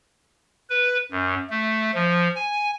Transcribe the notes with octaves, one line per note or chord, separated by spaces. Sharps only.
B4
F#2
A3
F3
G#5